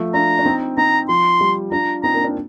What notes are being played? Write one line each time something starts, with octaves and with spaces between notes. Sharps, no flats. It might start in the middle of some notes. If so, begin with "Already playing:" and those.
Already playing: F3 A3
D4 F4 A#5
D4
C4 D#4
C4 D#4 A#5
F3 C6
G3
D4 F4 A#5
C4 D#4 A#5
A#3 D4
A#3 D4